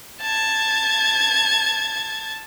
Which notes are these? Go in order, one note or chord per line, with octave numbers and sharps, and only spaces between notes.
A5 G#6